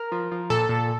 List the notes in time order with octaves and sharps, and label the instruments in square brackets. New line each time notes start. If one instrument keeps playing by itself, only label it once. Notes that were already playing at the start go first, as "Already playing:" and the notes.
Already playing: [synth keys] A#4
F3
F3
A#2 A4
A#2